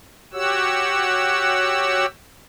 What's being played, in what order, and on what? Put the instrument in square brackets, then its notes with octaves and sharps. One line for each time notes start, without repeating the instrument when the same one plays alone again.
[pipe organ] F#4 G4 C#5 F#5 E6